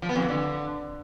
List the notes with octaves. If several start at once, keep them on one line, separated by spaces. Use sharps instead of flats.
F3
B3
F2
E3
D3